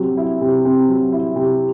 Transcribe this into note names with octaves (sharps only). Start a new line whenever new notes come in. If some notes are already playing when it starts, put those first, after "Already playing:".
Already playing: C3 F#3 C4
E4
C3
C4
F#3
E4
C3